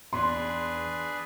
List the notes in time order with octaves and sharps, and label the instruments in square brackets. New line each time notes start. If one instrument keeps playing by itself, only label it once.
[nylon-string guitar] E2 [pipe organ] D4 G#4 B4 [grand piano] C6